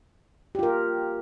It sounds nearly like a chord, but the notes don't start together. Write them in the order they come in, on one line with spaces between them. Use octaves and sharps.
G4 F4 A#4